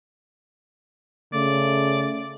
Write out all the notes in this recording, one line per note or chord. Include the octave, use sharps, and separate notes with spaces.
C#3 A3 D5